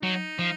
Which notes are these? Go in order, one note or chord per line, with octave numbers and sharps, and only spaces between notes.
F#3 D#4
F3